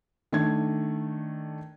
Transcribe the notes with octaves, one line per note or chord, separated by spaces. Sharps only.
D#3 A3 D4 G#6